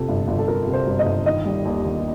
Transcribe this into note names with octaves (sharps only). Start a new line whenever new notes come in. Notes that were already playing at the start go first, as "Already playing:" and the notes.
Already playing: F2 C3 A4
G1
G1
A4
F2 A#4
C3
C5
G1
D#5
G1
D#3 D#5
G3
D#2
D#2